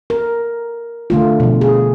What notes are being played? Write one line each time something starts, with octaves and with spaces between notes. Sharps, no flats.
A#4
D3 A3 F4
B2 F3
G#4